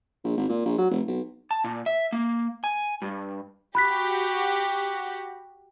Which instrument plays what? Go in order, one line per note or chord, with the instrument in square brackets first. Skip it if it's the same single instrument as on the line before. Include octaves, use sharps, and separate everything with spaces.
[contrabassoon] A#1
G#1
A#2
A#1
F#3
F1
B1
[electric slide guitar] A5
A#2
E5
A#3
G#5
G2
[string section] F#4 G4 [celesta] B5 F#6 B6